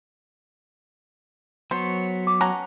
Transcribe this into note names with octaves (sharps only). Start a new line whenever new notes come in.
F#3 B3 C5 C#5
D6
C#4 F#5 A5 A#5